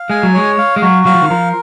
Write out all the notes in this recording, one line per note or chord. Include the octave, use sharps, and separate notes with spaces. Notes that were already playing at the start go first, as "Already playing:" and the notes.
Already playing: F5
G#3 G#5
F#3
G#3 C#5
F5
G#3
F#3 F#4
F#3 F5
F3
D#3
F3 A#4